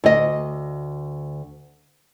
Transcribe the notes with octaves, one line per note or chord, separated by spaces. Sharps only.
D2 D#5